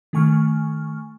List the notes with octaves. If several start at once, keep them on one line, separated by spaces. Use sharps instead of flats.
D#3 A3 G#5 C#6 F6